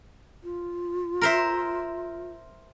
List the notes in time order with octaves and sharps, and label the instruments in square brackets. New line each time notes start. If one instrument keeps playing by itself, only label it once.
[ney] F4
[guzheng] A#4 C5 E5